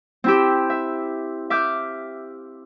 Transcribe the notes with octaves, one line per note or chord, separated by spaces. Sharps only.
C4 E4 G4
E5
E5 D6 F6 G6